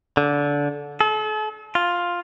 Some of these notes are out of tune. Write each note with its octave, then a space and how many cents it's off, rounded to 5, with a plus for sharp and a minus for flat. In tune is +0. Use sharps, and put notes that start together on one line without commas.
D3 -20
A4 -40
F4 +5